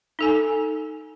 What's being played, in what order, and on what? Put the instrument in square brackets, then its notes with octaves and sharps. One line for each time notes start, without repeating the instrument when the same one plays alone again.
[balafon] D#4 A4 G#5